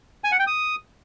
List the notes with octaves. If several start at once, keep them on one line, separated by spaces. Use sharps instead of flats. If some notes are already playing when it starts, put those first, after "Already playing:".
G#5
F#5
G5
D#6